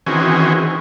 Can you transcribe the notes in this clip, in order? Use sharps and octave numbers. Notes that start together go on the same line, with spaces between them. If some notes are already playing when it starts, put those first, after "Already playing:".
D#3 E3 C4 C#4 F#4 G#4